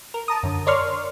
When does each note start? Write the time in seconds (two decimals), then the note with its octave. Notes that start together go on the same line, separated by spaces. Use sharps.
0.14 A#4
0.28 A5 A#5 D#6
0.43 F#2 D3
0.66 A#4 C#5 D5 C6 C#6 F6